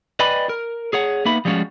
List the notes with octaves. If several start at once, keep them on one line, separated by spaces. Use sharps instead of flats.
B4 D5 D#5 G5 G#5 B5
A#4
G#4 C#5 F#5
A#3 B3 D#4 E5 B5
F3 G3 G#3 C#4 F4 F#4